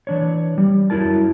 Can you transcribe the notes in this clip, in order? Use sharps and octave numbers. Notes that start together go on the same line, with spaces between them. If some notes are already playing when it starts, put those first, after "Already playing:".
E3 D4 C#5
G3
F#2 F#3 E4 A#4 A5